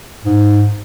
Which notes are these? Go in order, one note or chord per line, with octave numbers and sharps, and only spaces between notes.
G#2